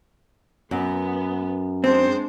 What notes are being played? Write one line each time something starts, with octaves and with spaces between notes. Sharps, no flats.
F#2 B3
G#3 C4 D4 C5